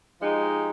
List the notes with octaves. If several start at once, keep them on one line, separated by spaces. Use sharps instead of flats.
F3 G#3 D#4 G4